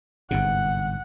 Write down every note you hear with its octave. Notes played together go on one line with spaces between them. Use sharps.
G1 G#2 C3 F#5 F#6